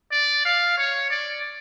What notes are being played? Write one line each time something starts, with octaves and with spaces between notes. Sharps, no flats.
D5
F5
C#5
D5